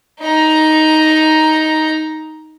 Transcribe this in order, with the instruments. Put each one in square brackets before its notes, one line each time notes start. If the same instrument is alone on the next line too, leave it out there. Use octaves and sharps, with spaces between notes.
[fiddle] D#4 A#5